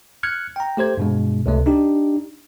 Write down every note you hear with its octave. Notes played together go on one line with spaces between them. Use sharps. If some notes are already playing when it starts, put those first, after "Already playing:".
F6 F#6 G#6 C#7
G5 A#5
A3 G4 C5 G#6
G2 B2 G#3
C#2 C3 A3
D4 D#4 G4